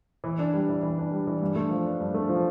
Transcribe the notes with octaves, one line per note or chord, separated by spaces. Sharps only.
E3
D4
G3
E3
E3
D4
G3
E3
G2
A3
F3
D4
G2
A3
F3